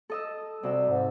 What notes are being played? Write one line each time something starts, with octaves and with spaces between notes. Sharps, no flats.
A4 D#5 E6
C3 G3 F#4 E6
G#2